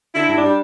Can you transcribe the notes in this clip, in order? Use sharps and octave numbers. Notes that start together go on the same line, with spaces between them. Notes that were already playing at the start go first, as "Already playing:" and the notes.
D3 E4
G2
D4
G3